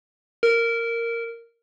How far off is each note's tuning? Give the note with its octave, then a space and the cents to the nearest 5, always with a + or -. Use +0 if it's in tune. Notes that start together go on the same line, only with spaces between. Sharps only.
A#4 -10